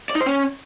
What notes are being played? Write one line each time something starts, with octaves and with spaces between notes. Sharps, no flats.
D5
D#4
C5
C#4